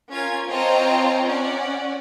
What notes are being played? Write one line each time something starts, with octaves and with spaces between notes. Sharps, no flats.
C#4 F4 A#4 G#6
C4 F4 C#5 D#5 A5 A#5
C#4 D5 F#5